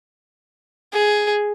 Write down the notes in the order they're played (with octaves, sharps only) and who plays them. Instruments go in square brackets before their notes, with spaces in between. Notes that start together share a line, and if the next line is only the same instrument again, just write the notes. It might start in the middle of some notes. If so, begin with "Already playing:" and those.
[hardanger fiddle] G#4